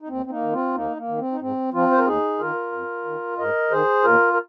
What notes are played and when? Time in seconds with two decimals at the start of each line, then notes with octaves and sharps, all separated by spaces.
0.02 D#4
0.08 D#2 C4
0.26 C4
0.31 A#3 D#4
0.42 D#3
0.53 C4 F4
0.75 D#2 A#3 D#4
0.97 A#3
1.08 D#3
1.19 C4
1.32 D#4
1.41 G#2 C4
1.73 F3 C4 F4
1.92 C5
1.98 A#4
2.06 D#2 D#4 G#4
2.39 D#3 F4 A#4
2.72 F2
3.05 D#3
3.38 G#2 A#4 D#5
3.71 D#3 G#4 C5
4.04 D#2 F4 A#4
4.33 A#4